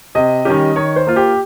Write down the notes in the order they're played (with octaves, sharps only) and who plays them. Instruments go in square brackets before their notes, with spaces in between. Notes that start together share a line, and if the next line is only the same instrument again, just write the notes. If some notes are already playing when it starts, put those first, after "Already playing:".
[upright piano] C3 [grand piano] D#5
[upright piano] D#3 G3 C#4 G4
[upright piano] D#3 [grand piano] C#5
[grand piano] C5
[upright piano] A#3 F4
[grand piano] G4